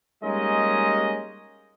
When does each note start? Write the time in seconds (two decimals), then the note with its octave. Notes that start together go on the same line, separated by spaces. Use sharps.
0.24 G3 G#3 A#3 C#4 D#4 D#5